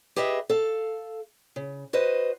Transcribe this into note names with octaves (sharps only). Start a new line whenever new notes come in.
G4 G#4 B4 D#5 E5
A4 F5
C#3
F#4 B4 C5 D#5